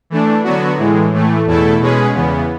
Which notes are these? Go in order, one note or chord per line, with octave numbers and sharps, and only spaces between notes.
E3 A3 D4
D3 F#3 B3 F#4
A2 E3 G#3
A2 E3 A3
E2 B2 A3 E4 A4
B2 G#3 C#4 G#4 B4
E2 C#3 E3 B3